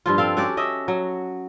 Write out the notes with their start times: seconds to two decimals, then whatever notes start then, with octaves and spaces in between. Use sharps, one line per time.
0.06 G2 F3 F4
0.18 C4 A4 F5
0.37 C#4 F#4 G4 D5
0.57 C#4 D#5 E5
0.88 F#3